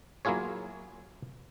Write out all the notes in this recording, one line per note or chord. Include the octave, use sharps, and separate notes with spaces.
F#3 A#3 E4 F4 G#4 C#5